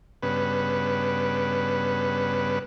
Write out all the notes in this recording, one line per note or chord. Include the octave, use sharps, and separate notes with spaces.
G2 C#3 B3 B4